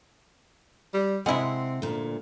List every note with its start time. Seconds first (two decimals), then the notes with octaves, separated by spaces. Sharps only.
0.93 G3
1.26 C3 G#3 C4 E4 F#5
1.82 D2 A#2